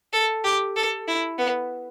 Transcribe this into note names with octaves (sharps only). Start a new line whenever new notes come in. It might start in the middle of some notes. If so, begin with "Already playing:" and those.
A4
G4
A4
E4
B3